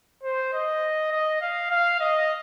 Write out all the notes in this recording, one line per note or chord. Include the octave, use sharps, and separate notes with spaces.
C5
D#5
D#5
F5
F5
D#5